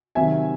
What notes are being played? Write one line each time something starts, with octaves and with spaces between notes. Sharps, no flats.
C3 D#3 F#3 C4 E5 G#5